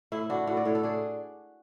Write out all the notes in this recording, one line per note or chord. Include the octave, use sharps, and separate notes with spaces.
A2 E4
D4 F#4
A2 F#4
D5
A2 C#5
A4
D4 G#4